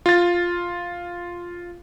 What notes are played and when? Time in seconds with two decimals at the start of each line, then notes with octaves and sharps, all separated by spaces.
0.06 F4 A6